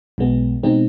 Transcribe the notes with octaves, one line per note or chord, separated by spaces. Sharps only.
B1 B2 G#3 B3
B2 G#3 C4 D#4